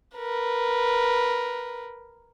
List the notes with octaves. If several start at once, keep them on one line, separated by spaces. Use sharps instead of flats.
A#4 B4